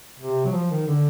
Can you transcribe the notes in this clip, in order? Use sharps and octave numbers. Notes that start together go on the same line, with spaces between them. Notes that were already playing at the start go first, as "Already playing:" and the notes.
C3
F#3
F3
D#3
D3